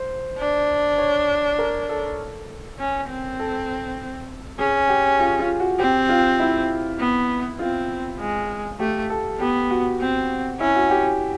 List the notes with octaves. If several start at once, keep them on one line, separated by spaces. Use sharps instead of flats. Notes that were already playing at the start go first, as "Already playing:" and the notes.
Already playing: C5
D4
C#5
A#4
A4
C#4
C4
A4
C#4 G#4
G4
F4
F4
F#4
C4 G4
F4
E4
B3
C4 F4
G#3
A3 G4
A4
B3 G4
F#4
C4
C#4 E4
F#4
G4